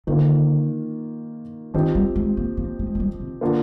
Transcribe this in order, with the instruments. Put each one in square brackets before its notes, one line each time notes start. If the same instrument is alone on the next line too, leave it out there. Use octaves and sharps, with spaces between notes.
[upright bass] D3 [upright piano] D#3 A#3 F4
[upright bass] D#3 [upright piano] F3 C4 G4 C5 D#5
[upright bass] G3
G#3
A#3
A#3
G#3
G#3
G3
C3
[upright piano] D3 F3 A#3